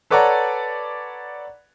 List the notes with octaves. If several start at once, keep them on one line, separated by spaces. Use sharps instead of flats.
A4 B4 C#5 D5 F#5 A#5